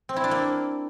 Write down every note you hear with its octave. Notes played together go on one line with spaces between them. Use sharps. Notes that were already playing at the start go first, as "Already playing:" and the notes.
C4
E4
D4
A#3